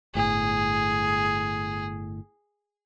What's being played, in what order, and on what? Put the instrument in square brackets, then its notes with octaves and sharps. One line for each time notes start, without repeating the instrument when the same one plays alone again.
[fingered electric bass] G1 A2 [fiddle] G#4